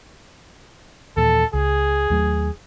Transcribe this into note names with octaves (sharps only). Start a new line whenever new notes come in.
D#2 A#2 E3 A4
C#2 G#4
D#2 F#3 A3